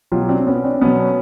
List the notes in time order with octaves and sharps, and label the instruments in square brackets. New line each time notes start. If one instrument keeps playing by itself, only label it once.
[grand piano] B2 F#3 F4 G4
C4 D4
B3 C#4
C4 D4
B2 F#3 B3 C#4